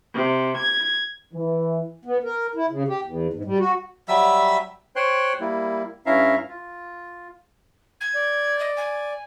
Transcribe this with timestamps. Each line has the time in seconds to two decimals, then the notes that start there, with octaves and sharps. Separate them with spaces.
0.14 C3
0.55 G#6
1.34 E3
2.05 B3
2.23 A#4
2.55 E4
2.70 C#3
2.88 G4
3.04 E2
3.33 G#2
3.45 G3
3.58 F#4
4.08 F#3 G3 E5 E6
4.96 C5 C#5 G5 C6 F#6
5.40 G3 A#3 E4
6.06 G2 C#4 E4 E5 F5 A#5
6.49 F4
8.00 G#6
8.15 D5
8.59 D#5
8.76 G#5